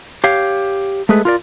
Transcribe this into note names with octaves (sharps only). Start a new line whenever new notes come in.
G4 C#5 F5
G#3 A3 G#4 A4 B4
F4 A#4 D5